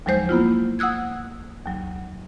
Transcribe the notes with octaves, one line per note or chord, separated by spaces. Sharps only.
D#2 F3 F#3 G#3 C5 G6
A#3 B3 E4 F4
F#5 D#6 E6 F#6 G#6
D#2 F#3